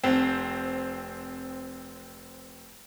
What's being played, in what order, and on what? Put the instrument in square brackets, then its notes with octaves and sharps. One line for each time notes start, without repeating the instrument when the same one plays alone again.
[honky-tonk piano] F1 C4